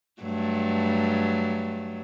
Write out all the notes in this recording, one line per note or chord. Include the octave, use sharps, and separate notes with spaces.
G2 F#3 A3